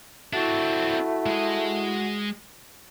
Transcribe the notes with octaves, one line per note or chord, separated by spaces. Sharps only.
A3 C4 D4 E4 F#4
G#3 D#5